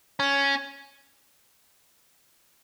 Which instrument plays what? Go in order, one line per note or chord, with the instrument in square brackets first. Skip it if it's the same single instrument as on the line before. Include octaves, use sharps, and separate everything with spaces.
[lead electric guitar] C#4